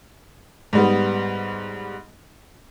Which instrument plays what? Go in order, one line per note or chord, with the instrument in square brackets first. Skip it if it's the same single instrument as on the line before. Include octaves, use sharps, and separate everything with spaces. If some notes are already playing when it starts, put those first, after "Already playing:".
[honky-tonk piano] G#2 G3 B3